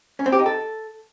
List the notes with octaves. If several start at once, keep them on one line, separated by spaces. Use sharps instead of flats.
C#4
C4
G4
D#4
A4